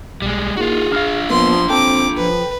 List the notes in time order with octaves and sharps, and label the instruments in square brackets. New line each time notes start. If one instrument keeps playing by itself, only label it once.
[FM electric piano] B1 [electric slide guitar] G3 G#3
[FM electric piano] A#3 D#4 [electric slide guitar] F4 F#4 [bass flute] G#4
[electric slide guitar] D4 F4 F5 [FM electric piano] F6 A#6 C7
[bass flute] F3 [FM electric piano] A#3 B3 [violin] C6
[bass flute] C4 [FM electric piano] A4 G5 [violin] D6
[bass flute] F3 [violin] B4